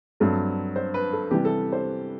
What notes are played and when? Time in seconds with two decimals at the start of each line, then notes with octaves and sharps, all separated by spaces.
0.20 G2 F#3 A3 C4
0.76 C5
0.94 B4
1.13 A4
1.31 C3 E3 G3 G4
1.45 A4
1.73 C5